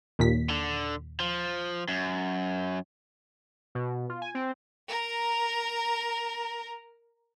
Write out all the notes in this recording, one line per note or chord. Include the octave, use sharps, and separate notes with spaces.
D#2 A#2 B6
D3
F3
F#2
B2
F4
G#5
C4
A#4 A#5